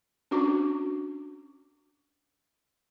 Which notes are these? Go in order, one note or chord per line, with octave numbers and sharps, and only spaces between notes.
C#4 D4 F#4 D6